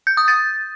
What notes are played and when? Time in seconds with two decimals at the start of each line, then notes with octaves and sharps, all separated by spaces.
0.07 G6
0.17 D#6
0.28 A6